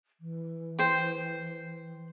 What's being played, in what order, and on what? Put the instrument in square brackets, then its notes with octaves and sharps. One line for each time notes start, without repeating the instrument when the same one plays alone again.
[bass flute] E3
[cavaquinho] C5 G5